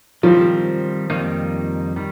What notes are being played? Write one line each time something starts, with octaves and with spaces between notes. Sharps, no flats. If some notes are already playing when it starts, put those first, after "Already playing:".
D#3 F3 G3 C4
F2 D#3 G3 A#3 D#4
D#3 G3